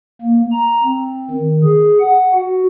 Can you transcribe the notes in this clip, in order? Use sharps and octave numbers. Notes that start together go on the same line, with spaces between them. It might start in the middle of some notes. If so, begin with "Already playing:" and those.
A#3
A#5
C4
D#3
G#4
F#5
F#4